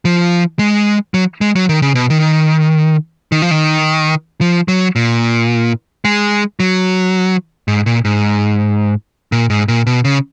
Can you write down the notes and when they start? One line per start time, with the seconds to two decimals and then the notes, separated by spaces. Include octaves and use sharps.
0.05 F3
0.59 G#3
1.14 F#3
1.41 G#3
1.55 F#3
1.69 D#3
1.82 C#3
1.95 B2
2.10 D#3
3.32 D#3
3.42 F3
3.51 D#3
4.41 F3
4.68 F#3
4.96 A#2
6.05 G#3
6.60 F#3
7.68 G#2
7.86 A#2
8.05 G#2
9.32 A#2
9.50 G#2
9.68 A#2
9.87 B2
10.05 C#3